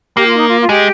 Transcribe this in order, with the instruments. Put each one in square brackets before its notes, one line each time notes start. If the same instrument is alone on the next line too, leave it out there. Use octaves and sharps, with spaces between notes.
[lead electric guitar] A#3 [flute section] G4
[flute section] F4
D#4
F4
F4
[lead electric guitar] G#3 [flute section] G4